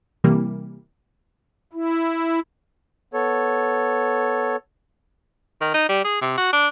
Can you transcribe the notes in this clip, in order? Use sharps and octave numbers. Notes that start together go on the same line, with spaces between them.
C3 E3 G3 A#3
E4
B3 A4 C#5
D#3
D#4
G3
G#4
C3
F#4
D4